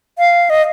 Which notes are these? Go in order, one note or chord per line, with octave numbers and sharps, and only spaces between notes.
F5
D#5